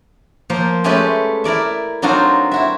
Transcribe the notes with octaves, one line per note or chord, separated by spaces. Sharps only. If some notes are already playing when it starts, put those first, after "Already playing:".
F3 A#3 C5
G#3 A3 C#4 G4 A4 B4
E4 A#4 D5 E5
F#3 C4 D4 D#4 F4 F#4
E4 F#4 E5